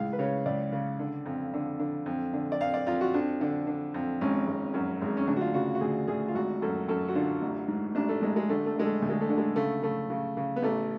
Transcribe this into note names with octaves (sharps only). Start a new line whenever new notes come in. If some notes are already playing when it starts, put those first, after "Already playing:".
Already playing: C#2 A2 F5
B4
C#3 C#5
C#2 D5
C#3
D3
F2
D3
D3
F2
D3
D5
F2 F5
D5
F2 F4
F#4
F2 D4
D3
D3
F2
G#1 C#4
G#1
F#2
G#1
C#4
D2 D4
F#4
F4
C#3 F#4
F#4
D2 G#4
D2 G#4
F4
G#1 F#4
F#2 A4
F#2 A4
F#4
D3 F4
A1
G#2
A1 D4
A3
A1 G#3
G#3
D3 A3
A3
D3 G#3
A3
D2
G#3
A3
D3
G#3
C#3 A3
C#3 A3
C#3
C#3
B3
A1 A3